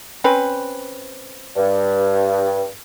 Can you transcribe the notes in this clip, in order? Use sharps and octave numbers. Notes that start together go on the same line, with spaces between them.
C4 C#4 B4
G2